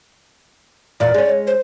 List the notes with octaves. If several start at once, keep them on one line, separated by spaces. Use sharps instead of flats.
E2 A#2 D5
G#3 C#4
C5